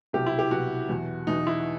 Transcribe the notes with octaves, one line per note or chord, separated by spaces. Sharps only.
C2 B2 F#3 G4
E4
G4
C2 B2 F#3 F#4
E2 B2 F#3
E2 B2 F#3 D#4
E4